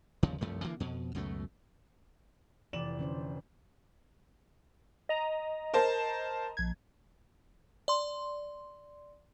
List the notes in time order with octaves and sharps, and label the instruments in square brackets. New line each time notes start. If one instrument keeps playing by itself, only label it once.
[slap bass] G1 D#2 C#3 F3
C2 F#2 F3 A3
D3 E3 G#3 A#3
F2 B2
C#2 F#2 B2 A3
[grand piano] F1 E7 F#7 [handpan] E3 D5
[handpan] D3 C#4 C5
[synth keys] D#5 A#5
[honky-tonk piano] A#4 C5 A5
[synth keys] A#1 G#6
[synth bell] D5 C6